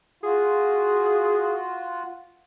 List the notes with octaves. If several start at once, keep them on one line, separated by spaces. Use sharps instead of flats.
F4 F#4 G#4